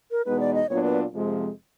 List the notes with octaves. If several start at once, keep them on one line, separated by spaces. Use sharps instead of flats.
A#4
E2 B2 G#3 B3 D#4 B4
D5
D#5
A#2 F#3 B3 D4 F4 C#5
B4
F2 C3 F3 G#3